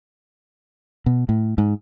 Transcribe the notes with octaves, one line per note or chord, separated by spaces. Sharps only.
B2
A2
G#2